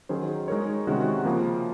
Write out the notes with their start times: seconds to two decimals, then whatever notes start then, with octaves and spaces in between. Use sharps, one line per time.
0.09 D#3 F#3 C#4 G#4 C5
0.48 G#3 D#4 A#4 C#5
0.87 C3 D#3 G#3 C#4 F#4
1.25 C#3 F3 A#3